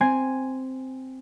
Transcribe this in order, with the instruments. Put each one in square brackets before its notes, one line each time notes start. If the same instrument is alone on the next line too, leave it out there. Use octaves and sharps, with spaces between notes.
[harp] C4 G#5 G#6 C7